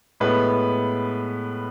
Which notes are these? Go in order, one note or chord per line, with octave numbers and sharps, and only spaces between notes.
A2 G#3 B3 B4